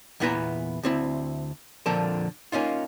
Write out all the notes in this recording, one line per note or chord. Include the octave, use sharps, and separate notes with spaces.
E2 A#2 B3 E4 B4 A#5
D2 C4 E4
F2 A#2 D3 F3 A4 A#4
A#3 C#4 D#4 F4